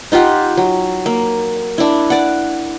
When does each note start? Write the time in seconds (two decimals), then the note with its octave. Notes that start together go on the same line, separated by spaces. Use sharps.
0.12 D#4 F4 G4 F#5
0.57 F#3
1.06 A#3
1.78 D4 E4
2.10 D5 F#5